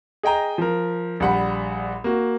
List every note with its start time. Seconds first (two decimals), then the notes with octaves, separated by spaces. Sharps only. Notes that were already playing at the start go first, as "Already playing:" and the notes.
0.23 G#4 D#5 G5 A#5
0.58 F3 A#4
1.20 A#1 G3 F#5 B5
2.04 A#3 F#4